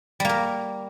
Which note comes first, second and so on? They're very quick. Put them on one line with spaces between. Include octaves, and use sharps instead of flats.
G3 A#3 A#4